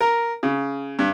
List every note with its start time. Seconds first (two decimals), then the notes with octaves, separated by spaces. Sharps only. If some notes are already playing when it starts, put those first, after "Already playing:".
0.01 A#4
0.43 C#3
0.99 G2